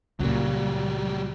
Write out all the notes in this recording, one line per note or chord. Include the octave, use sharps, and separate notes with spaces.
C#2 A#2 F#3 G3